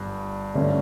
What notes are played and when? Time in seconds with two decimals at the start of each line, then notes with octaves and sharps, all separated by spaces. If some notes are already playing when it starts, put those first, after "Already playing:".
Already playing: G1 G2
0.55 G1 G2 D3 A3 C#4